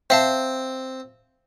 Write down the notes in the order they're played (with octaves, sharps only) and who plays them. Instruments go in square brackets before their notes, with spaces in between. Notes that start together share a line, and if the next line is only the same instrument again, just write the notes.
[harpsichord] C4 [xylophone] E5 F5 A5